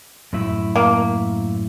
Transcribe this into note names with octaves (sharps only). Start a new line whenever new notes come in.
F#2 A2 E4
A#3